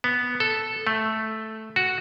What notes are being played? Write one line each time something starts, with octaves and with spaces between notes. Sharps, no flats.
B3
A4
A3
F#4